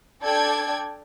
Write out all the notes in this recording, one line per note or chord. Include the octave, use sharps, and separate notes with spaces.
D4 A4 D5 G5 G#6